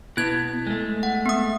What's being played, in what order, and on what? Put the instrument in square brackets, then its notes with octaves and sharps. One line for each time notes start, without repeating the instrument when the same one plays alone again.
[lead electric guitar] B2 B3 [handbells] E4 G#6
[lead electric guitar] G#3 A3
[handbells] F#5
B3 D#6